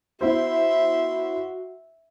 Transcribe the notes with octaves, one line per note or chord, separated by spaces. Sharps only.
B3 E4 F#4 C5 E5 C6